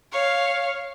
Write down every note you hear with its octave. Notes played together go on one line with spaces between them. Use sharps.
C#5 F5